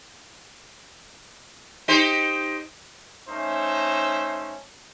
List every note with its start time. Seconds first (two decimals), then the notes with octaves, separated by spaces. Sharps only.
1.88 D#4 G4 C5
3.29 A3 C#4 D#4 C5 E5